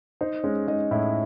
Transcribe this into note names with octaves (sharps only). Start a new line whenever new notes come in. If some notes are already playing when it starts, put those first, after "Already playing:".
D#4 C5
G#3 C#4 C#5
G#3 D#4 D#5
A2 E4 E5